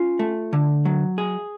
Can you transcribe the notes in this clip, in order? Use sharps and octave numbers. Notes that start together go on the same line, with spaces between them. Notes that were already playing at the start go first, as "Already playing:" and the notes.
Already playing: C#4 F4
A3
D3
F#3
G#4